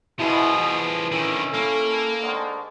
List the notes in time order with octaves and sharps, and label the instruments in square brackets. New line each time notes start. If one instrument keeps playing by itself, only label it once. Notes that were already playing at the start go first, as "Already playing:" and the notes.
[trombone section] B2 [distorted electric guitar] F3 G#4 [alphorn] E4
[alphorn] E3
[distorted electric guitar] D3 D#3 [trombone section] C#4 E4
[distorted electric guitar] A#3 [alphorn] A4
[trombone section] G#2 D3 D#3